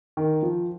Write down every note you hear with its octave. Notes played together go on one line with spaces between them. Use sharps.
D#3
F3